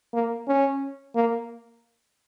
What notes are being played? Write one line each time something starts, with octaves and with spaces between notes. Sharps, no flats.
A#3
C#4
A#3